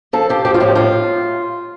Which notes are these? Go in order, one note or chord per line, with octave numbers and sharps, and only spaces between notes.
F3 A4
F3 G4
F3 G4
F4
A2 G4
A2 F4